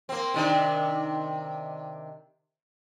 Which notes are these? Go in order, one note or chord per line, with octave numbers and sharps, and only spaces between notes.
A#3 C4
C3 D#3 D4